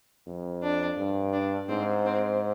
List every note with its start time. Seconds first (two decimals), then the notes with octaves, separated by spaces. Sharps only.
0.27 F2
0.63 D4
0.97 G2
1.33 D4
1.69 G#2 C4
2.05 C4